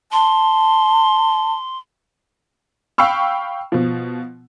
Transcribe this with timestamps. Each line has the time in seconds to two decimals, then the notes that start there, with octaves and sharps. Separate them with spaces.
0.12 A5 C6
2.98 F5 G5 B5 C#6 E6
3.72 B2 F3